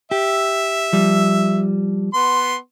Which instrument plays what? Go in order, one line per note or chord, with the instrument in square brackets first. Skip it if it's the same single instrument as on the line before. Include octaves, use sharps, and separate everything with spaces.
[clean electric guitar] G4 [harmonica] E5
[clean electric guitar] F3 G3
[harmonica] B3 C6